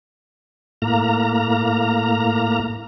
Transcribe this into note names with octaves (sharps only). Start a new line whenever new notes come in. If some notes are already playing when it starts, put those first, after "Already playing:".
A2 A#3 A#5